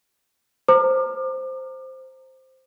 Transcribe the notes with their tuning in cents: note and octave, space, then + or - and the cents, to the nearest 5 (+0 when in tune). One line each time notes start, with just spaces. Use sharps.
C5 +0 A#5 -20 D6 +35